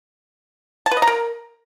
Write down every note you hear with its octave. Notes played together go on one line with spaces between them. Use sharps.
A5
B4
D#5
A#5
A#4